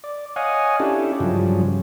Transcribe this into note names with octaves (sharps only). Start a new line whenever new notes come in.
D5
C#5 D#5 F5 F#5 G#5
C#4 D4 E4 G4 A4
G2 C#3 F3 F#3